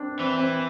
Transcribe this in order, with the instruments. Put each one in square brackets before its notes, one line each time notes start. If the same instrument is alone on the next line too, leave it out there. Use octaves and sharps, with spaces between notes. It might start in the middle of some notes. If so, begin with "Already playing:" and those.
Already playing: [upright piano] C4 D4
[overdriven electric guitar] E3 [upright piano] C4
[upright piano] C4